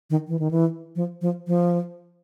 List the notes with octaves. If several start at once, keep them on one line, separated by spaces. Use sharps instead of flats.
D#3
E3
D#3
E3
F3
F3
F3